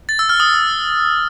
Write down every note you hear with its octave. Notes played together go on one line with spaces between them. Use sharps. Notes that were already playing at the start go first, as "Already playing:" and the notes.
A6
E6
F6
D#6